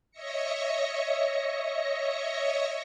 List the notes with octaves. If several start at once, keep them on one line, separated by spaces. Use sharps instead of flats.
C#5 D#5 E5 A#6 C#7